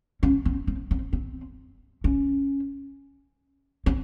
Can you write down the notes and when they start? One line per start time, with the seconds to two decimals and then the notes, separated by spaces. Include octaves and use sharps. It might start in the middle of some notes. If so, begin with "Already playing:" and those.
0.23 C#4
0.45 C4
0.67 C4
0.91 C4
1.13 C4
2.04 C#4
3.86 C4